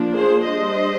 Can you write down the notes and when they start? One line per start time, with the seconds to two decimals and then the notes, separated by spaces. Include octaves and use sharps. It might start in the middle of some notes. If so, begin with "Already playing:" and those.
Already playing: F3 A#3 D4
0.13 G#4 C5
0.45 G3 D4 C5 D#5